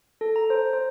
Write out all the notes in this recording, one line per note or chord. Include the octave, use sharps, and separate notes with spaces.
A4
A#5
C5
C5